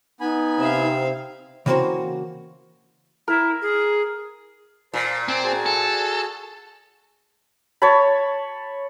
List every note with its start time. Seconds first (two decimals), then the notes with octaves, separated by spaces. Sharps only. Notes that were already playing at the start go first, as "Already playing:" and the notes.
0.20 B3 D#4 G#5 B5
0.59 C3 C4 E5 F5
1.66 C#3 E3 A#3 C4 F#4 C5
3.28 E4 A#4
3.62 G#4
4.94 A#2 C5 A5
5.28 C4 G#5 A5
5.44 F#4 G#4 A5
5.66 A4
7.82 C#5 A5 B5